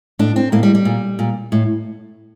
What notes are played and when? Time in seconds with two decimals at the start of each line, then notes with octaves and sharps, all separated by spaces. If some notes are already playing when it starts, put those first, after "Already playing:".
0.19 A2 D4
0.36 C4
0.52 A2 A#3
0.63 G3
0.75 G3
0.85 A#2
1.19 A#2
1.52 A2